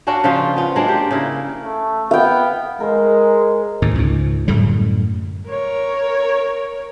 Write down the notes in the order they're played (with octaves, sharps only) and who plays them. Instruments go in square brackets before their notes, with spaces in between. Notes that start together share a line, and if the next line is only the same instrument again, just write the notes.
[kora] A#3 C#4 D4 F#4
C#3 F3 F4
B3 F4
F#3 G#3 A#3 D4
G4
C#3 E4 A#4
[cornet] A3
[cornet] B3 [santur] F5 G5
[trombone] G#3 [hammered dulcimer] A#4 C5
[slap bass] D#2 A2
C#2 G#2
F#2 A2 D3 G3
[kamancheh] A#4 C#5